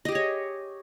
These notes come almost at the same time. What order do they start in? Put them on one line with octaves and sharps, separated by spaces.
D#5 G4 G#4 C#5